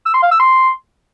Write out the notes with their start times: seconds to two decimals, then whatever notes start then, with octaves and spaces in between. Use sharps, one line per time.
0.06 E6
0.14 C6
0.23 F5
0.31 E6
0.40 C6